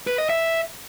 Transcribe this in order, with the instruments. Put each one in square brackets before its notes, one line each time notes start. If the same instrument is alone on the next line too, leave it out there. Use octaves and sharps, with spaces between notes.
[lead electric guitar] B4
D#5
E5